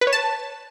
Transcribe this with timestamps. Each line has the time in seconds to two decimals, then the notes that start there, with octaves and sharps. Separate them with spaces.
0.01 B4
0.07 C#5
0.13 A5